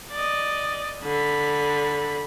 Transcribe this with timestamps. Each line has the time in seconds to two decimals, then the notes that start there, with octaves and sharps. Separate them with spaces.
0.11 D5 D#5
1.04 D3 B5